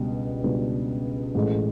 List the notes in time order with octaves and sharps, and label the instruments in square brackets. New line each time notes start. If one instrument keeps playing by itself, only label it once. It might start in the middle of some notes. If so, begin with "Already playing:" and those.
Already playing: [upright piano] C#2 B2 G3 B3 D4
C#2 B2 G3 B3 D4
A1 A2 E3 G#3